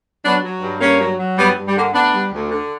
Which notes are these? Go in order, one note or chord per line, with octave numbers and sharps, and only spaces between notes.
F#3 B3 D4
F#3
G2
G2 A#3 C#4
F#3
F#3
G2 G3 B3
G2
G3
D3 A#3
D2 B3 D4
G3
D2
D3